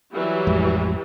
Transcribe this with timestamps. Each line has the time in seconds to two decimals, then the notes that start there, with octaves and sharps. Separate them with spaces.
0.13 E3 F#3 G3
0.47 A1 F2 G#3